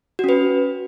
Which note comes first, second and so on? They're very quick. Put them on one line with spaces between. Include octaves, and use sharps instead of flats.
F#4 C#4 B4